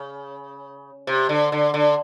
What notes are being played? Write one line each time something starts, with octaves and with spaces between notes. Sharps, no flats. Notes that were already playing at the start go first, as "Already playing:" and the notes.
Already playing: C#3
C3
D3
D3
D3